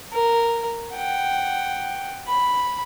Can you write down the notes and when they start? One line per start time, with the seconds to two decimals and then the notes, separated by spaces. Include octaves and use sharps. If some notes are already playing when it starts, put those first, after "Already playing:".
0.12 A#4
0.93 F#5 G5
2.27 B5